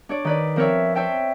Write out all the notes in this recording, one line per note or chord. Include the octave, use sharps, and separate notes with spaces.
D4 C#5 D5
D#3 B4 D5
F3 C4 A#4 B4 C#5 E5
C5 C#5 E5 G5 A5